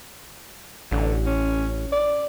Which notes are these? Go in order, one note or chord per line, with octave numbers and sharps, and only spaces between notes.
A1 D3
C#4
D5